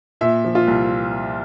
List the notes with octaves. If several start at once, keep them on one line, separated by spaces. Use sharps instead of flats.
A#2 E5
F3
F4
C2